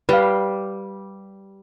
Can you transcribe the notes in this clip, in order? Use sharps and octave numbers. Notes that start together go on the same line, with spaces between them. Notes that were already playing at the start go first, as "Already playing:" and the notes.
G3 B4 F5